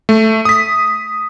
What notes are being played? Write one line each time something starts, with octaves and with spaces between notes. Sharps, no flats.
A3
D#6 B6